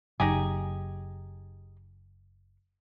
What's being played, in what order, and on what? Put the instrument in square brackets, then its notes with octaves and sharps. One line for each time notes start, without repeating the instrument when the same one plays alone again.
[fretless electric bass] F#1 [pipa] D#4 G4 G#4